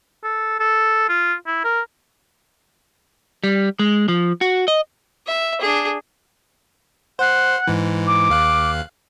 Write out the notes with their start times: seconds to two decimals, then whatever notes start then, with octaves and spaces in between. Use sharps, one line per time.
0.24 A4
0.60 A4
1.09 F4
1.47 E4
1.65 A#4
3.44 G3
3.79 G#3
4.08 F3
4.41 F#4
4.68 D#5
5.27 E5
5.61 D4 G#4
7.19 C5 F#5 C7
7.67 G#2 E3
8.07 D6
8.30 D#2 F5 F#6